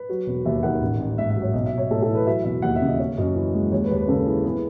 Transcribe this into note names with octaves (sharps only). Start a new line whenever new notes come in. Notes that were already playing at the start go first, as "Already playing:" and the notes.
Already playing: B4
F#3
E1
D#2 E5
D#3 F#5
A1
A1
G#2 E5
E5
F#3
C#5
B1 D#5
E5
B1
C#5
A2 A4
A4
E3
B4
F#3 E5
E1 E5
D#2 F#5
E5
C#3
D#5
C#4
F#2 D#5
E3
G#3
D#2 C#5
B4
D#2
B4
C#3 A4
E3 G#4
B3 G#4